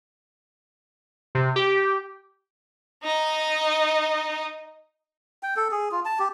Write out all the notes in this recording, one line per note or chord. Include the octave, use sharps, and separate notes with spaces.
C3
G4
D#4 D#5
G5
A4
G#4
F4
A5
G4